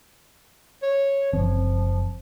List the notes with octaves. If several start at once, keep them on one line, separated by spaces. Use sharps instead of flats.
C#5
F#1 E3 F3 C4